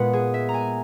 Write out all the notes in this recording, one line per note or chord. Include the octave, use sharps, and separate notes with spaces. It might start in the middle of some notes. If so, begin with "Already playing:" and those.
Already playing: A#2 G#3 B3 F#5
G#4
E5
A#5
G#5